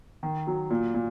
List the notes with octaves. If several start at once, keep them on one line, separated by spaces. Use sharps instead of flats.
D#3
F#3
A#2
A#2